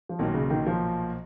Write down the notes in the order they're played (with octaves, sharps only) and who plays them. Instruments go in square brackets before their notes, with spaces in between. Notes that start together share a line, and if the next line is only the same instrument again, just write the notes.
[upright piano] F3
[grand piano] B1 A#2 F#3 A#3 [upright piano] D#3
[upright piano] C#3
D#3
F3